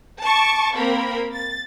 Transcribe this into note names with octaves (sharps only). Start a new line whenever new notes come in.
A5 C#6 D6
A#3 C4 A#4 B5
A6